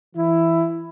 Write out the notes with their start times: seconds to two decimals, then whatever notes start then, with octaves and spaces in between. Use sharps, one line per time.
0.15 E3 E4